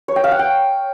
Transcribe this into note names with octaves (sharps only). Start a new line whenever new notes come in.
C#5
G5
F5
F#5
G5